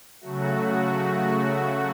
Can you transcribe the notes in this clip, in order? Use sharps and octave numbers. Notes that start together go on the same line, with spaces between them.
C#3 F#3 A3 F#4
F#4